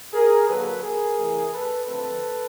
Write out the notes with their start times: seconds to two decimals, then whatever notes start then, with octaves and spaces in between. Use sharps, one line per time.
0.13 G#4 A#4
0.48 D3 F#3 A#3 A4 B4
0.82 G#4 A#4
1.17 C3 E3 A3
1.52 A4 B4
1.86 D3 F3 A3 C4 A4 B4